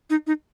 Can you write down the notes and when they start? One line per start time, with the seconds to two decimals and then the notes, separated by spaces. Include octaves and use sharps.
0.10 D#4
0.27 D#4